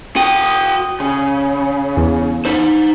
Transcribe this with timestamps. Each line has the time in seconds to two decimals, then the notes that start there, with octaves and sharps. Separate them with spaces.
0.16 F#4 G5 D#6
1.00 C#3
1.97 E2
2.45 D#4 C5